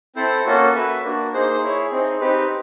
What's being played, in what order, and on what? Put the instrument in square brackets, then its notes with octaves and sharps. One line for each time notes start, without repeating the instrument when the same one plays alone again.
[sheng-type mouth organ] C4 E4 A4 C5
A#3 C#4 F#4 A4
F#4 B4 E5
A#3 D4 F#4
A#3 D#4 G#4 C5
E4 G#4 C#5
C4 D#4 G#4
C4 D#4 G4 B4